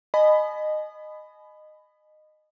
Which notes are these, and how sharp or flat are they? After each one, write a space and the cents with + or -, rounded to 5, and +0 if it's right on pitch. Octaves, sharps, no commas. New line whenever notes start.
D#5 -20 G#5 +35 B5 +15